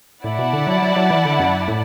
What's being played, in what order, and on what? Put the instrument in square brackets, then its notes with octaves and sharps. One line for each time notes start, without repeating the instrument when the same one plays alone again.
[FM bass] A2 [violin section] E4 D5 F#5 A5
[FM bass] B2
D3
F#3
F#3
F#3
E3
D3
F#2
A2